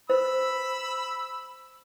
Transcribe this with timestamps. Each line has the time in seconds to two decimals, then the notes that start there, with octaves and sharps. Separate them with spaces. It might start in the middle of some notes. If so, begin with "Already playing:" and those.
0.10 C5 B5 E6